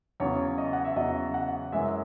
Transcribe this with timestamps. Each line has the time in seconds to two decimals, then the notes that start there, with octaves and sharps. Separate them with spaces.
0.20 E2 C#3 F#3 C#5
0.58 D#5
0.73 F#5
0.85 E5
0.96 E2 C#3 F#3 D#5
1.34 F#5
1.72 F#2 E3 G#3 E5